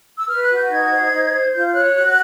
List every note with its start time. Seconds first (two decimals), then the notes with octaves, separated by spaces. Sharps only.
0.18 E6
0.28 B4 F6
0.43 F#6
0.50 F#4
0.57 G6
0.69 D#4 G#6
0.90 C5
1.11 D#4
1.33 C5
1.54 F4 G6
1.68 G6
1.74 C#5 F#6
1.95 F#4 F#6